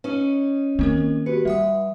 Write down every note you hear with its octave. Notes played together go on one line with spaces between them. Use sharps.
C#4 D#4 B4
D#3 A#3 C4 A#4
F#4 G4 B4 C#7
F3 G3 E5 F#5 D#6